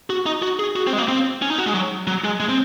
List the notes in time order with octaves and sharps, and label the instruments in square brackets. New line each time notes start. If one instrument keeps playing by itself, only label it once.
[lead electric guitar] F#4
D#4
F#4
G#4
F#4
C4
G#3
A#3
C4
C#4
D#4
F#4
G#3
F#3
F#3
G#3
G#3
C4